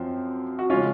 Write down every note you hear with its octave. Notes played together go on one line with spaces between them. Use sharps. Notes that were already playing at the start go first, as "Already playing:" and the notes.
Already playing: F#2 F3 C4
F#4
C#3 F3 G#3 C#4 F4